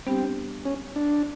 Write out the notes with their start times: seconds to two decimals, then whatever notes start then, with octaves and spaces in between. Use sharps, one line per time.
0.07 G3 B3 C4 D4 G4
0.65 C#4
0.96 D4